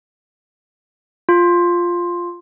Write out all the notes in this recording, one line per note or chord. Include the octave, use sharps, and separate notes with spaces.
F4